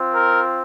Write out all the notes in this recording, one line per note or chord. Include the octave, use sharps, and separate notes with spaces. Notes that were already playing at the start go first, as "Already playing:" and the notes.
Already playing: C4 F4
A#4